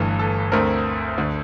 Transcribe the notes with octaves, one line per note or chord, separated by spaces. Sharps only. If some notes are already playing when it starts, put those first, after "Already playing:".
Already playing: G1 G2 E3 A3
A4
D2 D3 A3 C4 A#4
D2 D3 A3